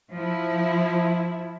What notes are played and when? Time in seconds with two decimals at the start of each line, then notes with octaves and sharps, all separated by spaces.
0.11 F3 E4